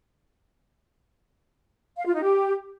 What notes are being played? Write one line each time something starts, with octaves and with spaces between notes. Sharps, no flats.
F5
F4
D#4
G4